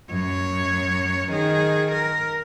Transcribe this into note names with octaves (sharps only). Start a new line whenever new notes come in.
F#2 C#5
D#3 G#4
A#4